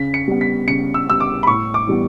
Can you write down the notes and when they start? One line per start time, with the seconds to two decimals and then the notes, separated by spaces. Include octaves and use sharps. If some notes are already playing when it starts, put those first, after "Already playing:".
Already playing: C#3 B6
0.14 C#7
0.28 G3 B3
0.41 B6
0.68 C#3 C#7
0.94 E6
1.07 G3 B3 E6
1.20 D6
1.43 B5
1.47 A2 C#6
1.74 D6
1.87 E3 G3 B3